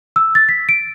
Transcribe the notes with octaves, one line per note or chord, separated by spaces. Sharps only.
E6
A6
B6
D7